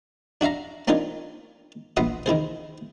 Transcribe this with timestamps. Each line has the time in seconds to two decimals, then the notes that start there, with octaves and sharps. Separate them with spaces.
0.41 D4 F#4 E5 F5 A#5
0.88 C4 D4 D#4 F4 A#4 C#5
1.97 A#1 B3 E5 F#5 C6 D#6
2.26 D#3 E4 G#4 C5